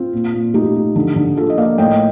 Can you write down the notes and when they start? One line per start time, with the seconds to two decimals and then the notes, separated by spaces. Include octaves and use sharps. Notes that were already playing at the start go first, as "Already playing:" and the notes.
Already playing: C4 F4
0.13 A#2
0.34 A#2
0.54 A3 D#4 G4
0.75 C4
0.96 D3
1.16 D3
1.36 F3 F4 A4
1.50 D#5
1.57 A#3 D5 F5
1.78 A2 D#5 G5